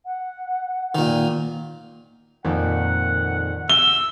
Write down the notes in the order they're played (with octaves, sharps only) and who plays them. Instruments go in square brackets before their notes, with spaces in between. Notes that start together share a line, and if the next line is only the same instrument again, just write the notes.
[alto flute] F#5
[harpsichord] A#2 D#3
[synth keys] F2 A#2 D#3 [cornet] F#5
[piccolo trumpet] E6 [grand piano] G7